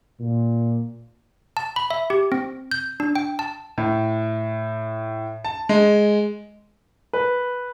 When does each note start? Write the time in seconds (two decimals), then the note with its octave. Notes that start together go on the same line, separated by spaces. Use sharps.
0.19 A#2
1.57 A5
1.76 B5
1.90 E5
2.10 G4
2.32 C4
2.71 G6
3.00 D4
3.15 G5
3.39 A5
3.78 A2
5.45 A5
5.69 G#3
7.13 B4